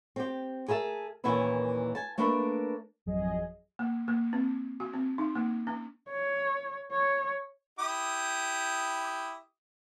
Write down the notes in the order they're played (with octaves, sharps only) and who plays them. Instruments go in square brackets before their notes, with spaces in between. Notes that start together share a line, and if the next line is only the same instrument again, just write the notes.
[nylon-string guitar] C4 G4
G#4 A#4 E5 A5
D#2 A#2 E3 C#4 E4 B4
G#5 A5
A3 A#3 D4 B4
[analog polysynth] G#1 F2 F#3 G#4 D#5
[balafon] A#3
A#3
C4
F#4
C4
D#4
A#3
C#4
[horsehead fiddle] C#5
C#5
[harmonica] E4 G4 D#6